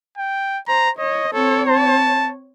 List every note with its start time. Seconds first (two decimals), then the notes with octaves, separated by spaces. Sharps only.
0.18 G5
0.68 C5 A#5
0.98 C#5 D#5
1.32 C4 A4 C#5
1.69 A5